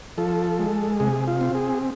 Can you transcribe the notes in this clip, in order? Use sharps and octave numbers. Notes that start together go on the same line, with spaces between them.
F3 A4
G#3
C3 G#4
F4
C4
G#4